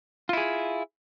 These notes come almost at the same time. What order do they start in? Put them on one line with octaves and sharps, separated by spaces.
F4 E4 G#4